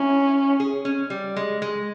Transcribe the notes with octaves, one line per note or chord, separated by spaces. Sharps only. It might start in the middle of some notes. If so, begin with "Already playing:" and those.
Already playing: C#4 E4
G#4
C#4
G3
G#3
G#3